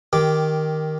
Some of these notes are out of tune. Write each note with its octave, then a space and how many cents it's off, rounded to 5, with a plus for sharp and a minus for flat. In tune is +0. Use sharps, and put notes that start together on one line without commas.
D#3 +0 G4 +0 D6 +0